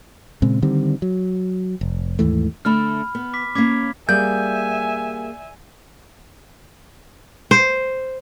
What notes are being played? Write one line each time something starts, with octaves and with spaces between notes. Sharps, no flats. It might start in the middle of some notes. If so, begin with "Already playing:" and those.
A#2 C#3 G#3 C4
D3 D#3 G3 C4
F#3
F1
D#2 G#2 E3 A3
D3 A3 E5 B5 F6
B3
D6 B6
A#3 C#4 D6 G#6 B6
G3 A#3 G#4 E5 G#5 G6
C5